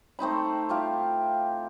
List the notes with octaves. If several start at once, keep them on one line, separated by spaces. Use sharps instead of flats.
A3 C4 D#4 B5
E4 F4 G4 F5